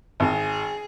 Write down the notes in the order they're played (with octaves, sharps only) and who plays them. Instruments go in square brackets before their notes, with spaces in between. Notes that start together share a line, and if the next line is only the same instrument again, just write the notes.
[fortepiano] G#1 [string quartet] G#4